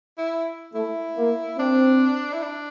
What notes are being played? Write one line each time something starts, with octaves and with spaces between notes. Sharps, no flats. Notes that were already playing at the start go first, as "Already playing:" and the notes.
E4
A3 E4
A#3
C4 D4
E4
D4